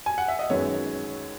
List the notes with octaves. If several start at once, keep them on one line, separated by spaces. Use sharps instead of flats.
G#5
F#5
E5
D#5
F#2 D#3 G#3 B3 C#5